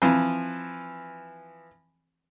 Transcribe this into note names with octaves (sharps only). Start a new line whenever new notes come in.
E3 F3 C4